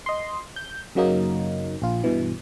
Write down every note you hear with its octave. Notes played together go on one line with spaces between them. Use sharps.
D#5 C6
G6
F#2 C#3 F#3 A#3 D#4
A#1 F4
G2 B2 E3